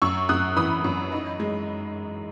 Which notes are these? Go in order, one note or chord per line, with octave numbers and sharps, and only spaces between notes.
F#2 C#6 E6
F#2 D#6 F#6
E3 B5 D#6
F#2
D#4
G#3